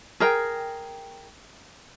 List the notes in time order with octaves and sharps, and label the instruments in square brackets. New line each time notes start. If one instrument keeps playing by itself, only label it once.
[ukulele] G#4 A#4 G5